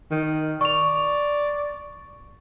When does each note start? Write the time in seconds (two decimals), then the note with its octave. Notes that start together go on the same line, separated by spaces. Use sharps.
0.11 D#3
0.61 D5 C#6 F7